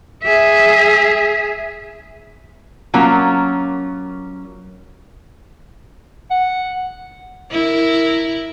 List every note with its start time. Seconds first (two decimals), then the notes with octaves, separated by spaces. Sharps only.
0.23 G#4 E5
2.94 F#3 A#3 C#4 F4
6.30 F#5
7.52 E4 A#4